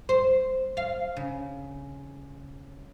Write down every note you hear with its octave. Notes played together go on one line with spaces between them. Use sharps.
C5
F5
C#3